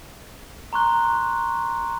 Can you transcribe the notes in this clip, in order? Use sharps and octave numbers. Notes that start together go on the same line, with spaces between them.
A#5 C6 C#6 F#6 G7